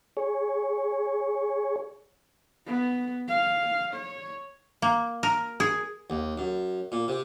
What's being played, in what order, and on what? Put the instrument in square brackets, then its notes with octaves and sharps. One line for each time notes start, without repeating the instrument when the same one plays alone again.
[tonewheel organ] G#4 C#5
[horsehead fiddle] B3
F5
C#5
[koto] A#3
A#4
G#4
[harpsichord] D#2
F#2
A#2
C3